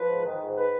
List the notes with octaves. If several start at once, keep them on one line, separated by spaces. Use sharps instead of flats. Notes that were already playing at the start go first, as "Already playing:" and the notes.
Already playing: F3 B4
G#2
D#3
G#2
B4